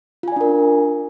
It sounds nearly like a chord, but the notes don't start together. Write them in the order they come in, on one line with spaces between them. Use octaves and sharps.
F4 G#5 D5 D4 A#4